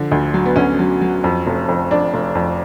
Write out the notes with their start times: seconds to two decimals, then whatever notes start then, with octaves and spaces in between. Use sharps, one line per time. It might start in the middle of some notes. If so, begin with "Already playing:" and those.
Already playing: D3 F3
0.11 D2
0.34 F#3
0.45 B3
0.56 D2 C#4
0.79 F#3
1.01 F#3
1.24 F2
1.47 F1
1.69 F2
1.91 F2 D4
2.14 F1
2.35 F2